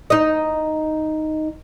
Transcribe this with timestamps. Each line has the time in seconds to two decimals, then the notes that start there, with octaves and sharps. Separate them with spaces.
0.10 D#4 D#5